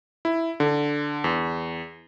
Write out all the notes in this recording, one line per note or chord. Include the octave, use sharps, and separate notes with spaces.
E4
D3
E2